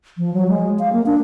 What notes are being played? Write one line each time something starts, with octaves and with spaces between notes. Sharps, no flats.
F3
F#3
G#3
F5
A#3
D4